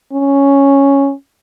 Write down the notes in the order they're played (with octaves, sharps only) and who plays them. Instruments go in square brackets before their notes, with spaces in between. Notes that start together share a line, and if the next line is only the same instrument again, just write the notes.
[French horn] C#4